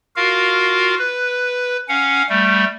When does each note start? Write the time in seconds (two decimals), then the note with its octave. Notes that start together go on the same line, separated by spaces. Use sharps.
0.16 F4 F#4 A#4 F5
0.99 B4
1.89 C#4 F5 F#5
2.29 G3 A3